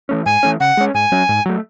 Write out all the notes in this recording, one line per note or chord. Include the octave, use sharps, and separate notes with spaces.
E3 A3 C#4
G#2 G#5
E3 A3 C#4
C#3 F#5
G#3 C#4
G#2 G#5
F#3 C#4
G#2
F#3 A3